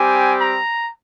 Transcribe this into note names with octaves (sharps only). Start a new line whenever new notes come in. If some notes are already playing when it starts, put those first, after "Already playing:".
Already playing: G3 C4 G4 G#5
A#5